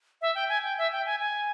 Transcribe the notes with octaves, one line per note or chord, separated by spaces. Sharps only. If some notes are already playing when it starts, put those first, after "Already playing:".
E5
G5
G#5
G5
E5
G5
G#5
G#5